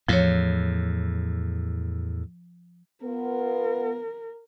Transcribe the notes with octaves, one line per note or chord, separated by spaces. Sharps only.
E2 A2 F3 C#5
B3 F4 A#4